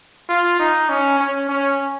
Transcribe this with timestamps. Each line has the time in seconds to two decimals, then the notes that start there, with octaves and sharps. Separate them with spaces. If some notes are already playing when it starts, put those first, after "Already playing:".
0.29 F4
0.59 D#4
0.89 C#4
1.19 C#4
1.49 C#4